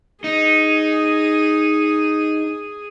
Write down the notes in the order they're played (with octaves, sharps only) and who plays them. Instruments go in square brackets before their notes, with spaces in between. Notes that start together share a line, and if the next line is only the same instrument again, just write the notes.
[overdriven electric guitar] D#4 [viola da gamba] G#4